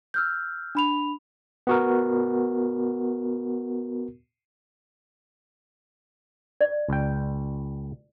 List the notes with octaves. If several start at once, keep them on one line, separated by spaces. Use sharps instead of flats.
E6 F6 G6
D4 B5 F7
B3 F#4 A#4
D5
C#2 G5